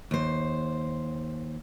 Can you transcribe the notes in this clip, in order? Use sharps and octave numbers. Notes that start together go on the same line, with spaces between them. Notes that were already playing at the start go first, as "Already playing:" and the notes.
D#2 C5